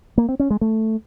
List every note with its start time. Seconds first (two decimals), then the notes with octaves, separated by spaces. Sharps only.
0.18 A#3
0.29 C4
0.40 C#4
0.50 G#3
0.61 A3